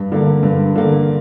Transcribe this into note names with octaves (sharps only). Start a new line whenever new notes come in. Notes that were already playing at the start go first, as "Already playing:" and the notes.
Already playing: G2
D3 A#3
G2
D3 A#3